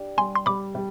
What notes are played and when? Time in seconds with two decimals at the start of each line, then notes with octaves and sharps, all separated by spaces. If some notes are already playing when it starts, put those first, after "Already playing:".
Already playing: D4 G4
0.17 G3 G#5 C6
0.36 C6
0.46 G3 B5 D6
0.75 G3